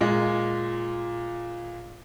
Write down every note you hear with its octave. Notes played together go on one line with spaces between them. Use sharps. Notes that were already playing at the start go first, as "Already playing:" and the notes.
A#2 G#3